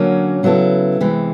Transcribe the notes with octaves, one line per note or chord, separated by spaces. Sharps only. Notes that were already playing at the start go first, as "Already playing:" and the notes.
Already playing: D3 F#3 A#3 C#4 F#4
C#3 F#3 B3 E4 A4
C3 E3 G#3